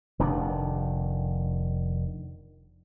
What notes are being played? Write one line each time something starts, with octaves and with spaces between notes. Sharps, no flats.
F1 D#3 D4